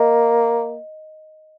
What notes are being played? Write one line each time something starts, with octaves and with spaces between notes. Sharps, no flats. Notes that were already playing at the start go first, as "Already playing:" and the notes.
Already playing: A#3 D#5